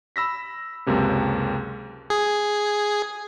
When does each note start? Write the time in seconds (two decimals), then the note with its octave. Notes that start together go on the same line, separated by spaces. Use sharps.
0.16 B5 E6 A#6 B6
0.87 C#2 F#2 C3 A#3
2.10 G#4